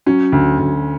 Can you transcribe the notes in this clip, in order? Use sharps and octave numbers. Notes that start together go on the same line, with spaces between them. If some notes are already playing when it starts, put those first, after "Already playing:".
F#3 C#4
D2
D2